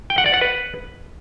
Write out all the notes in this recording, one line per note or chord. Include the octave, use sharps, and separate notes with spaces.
G5
F#5
D5
F#5
B4